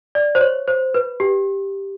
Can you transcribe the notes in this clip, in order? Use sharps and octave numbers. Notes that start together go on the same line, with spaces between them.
D5
C5
C#5
C5
B4
G4